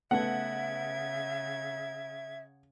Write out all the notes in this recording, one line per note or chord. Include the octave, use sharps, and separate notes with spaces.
C#3 A3 B3 E5 F#5 G#6